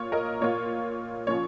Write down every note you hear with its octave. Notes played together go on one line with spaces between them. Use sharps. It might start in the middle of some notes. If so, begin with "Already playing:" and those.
Already playing: A#2 A#3 F4 C#5
A#4 D#5
A#2 A#3 F4 C#5
A#2 F3 C#4 F4 C#5